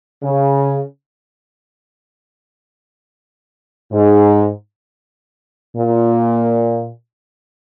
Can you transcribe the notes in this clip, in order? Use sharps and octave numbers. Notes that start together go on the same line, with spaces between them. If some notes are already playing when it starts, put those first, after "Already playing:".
C#3
G#2
A#2